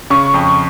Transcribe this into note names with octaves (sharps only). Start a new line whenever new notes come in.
C#3 C#6
F2